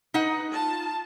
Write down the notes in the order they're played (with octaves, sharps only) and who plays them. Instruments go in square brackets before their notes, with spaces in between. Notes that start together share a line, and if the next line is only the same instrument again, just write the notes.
[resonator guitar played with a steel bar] D#4 F#5 [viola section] B4
[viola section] F4 A5